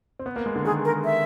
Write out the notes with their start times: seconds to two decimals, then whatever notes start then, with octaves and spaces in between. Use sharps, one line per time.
0.19 C4
0.26 B3
0.36 A#3
0.46 G#3
0.56 D3
0.65 D#3 G#4
0.85 A#4
1.05 E5